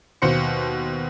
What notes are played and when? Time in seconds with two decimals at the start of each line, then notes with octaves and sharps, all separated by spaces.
0.22 D#2 B2 C5 C#7